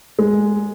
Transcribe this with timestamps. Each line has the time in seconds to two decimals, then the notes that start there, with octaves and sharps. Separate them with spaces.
0.19 G#3